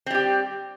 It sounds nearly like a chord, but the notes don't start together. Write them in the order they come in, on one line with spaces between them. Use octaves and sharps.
C4 G3 G4